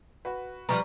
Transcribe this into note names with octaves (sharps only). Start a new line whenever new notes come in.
F#4 B4
F3 G3 B3 A#5 C#6